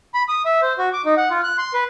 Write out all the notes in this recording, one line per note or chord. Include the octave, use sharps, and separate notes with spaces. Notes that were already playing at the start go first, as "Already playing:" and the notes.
B5
D#6
E5
C5
F#4
D6
D#4
F#5
F4
F#6
C6
B4